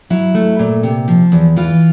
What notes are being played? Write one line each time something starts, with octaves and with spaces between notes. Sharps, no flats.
F#3 E4
A3
A#2
C3
F3
E2
E3 F4